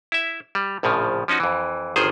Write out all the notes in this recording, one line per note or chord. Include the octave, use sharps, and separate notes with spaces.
E4 E5
G3
A#1 A2 C#3 F3
F3 C#4 D#4 F#4
F2 E3
G1 D#3 F3 G#4 C5